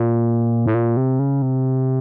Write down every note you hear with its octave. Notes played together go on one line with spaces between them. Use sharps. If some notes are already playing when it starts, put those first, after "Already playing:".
Already playing: A#2
A2
A#2
C3
C#3
C3